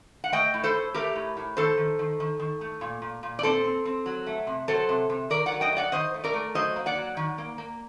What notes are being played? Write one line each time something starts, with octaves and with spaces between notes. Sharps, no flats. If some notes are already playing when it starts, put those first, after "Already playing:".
F#5
A3 D#5 G5
A2
A4 C5
A2
A3 G4 A#4
A2
A2
D#3 A4 C5
D#3
D#3
D#3
D#3
A3
A#2
A#2
A#2
D5
C4 A4 C5
C4
C4
F#3
A3
C3
F#3 A4 C5
C3
C3
D#3 A#4 D5
D5 F#5
F#3
D#5 G5
A3
D5 F#5
D#3 C5 D#5
A3
A#4 D5
A3
F#3 C5 D#5
A#3
D5 F#5
F#3
D#3
A#3
A#3